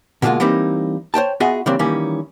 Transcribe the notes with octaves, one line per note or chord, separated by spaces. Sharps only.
B2 D3 G3 G#3 A#3 F4
E3 G3 A#3 C4 D#4
C5 C#5 G5 A5
B3 F4 F#4 G#4 D#5 E5
C#3 E3 G3 A#3 C4 D4
D#3 E3 G3 A#3 C#4